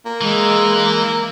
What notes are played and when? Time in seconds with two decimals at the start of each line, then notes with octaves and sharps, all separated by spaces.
0.05 A#3
0.21 E3 G#3